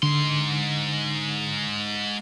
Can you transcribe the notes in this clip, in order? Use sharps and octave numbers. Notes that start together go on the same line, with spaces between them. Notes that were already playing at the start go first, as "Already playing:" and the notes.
G#2 D3 C6